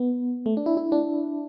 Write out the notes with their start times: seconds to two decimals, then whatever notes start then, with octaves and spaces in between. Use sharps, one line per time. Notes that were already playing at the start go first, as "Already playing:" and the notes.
Already playing: B3
0.46 A3
0.57 D4
0.66 E4
0.77 E4
0.92 D4